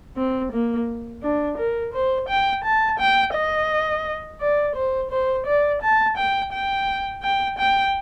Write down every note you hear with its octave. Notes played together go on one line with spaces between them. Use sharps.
C4
A#3
D4
A#4
C5
G5
A5
G5
D#5
D5
C5
C5
D5
A5
G5
G5
G5
G5